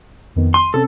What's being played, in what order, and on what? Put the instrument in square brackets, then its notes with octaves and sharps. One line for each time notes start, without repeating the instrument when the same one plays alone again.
[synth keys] F2 D#3 B3
[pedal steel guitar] C6 [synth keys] D#7
[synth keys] C3 C4 C#4 [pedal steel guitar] A4